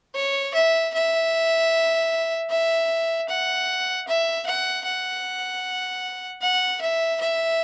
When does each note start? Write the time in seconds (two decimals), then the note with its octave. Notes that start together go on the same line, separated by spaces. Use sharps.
0.15 C#5
0.54 E5
0.94 E5
2.50 E5
3.29 F#5
4.08 E5
4.46 F#5
4.85 F#5
6.42 F#5
6.81 E5
7.21 E5